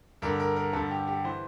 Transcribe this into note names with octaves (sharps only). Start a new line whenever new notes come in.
G2 D3 A#4
A#4
A#4
G2 D3 A4
G4
G4
E3 C5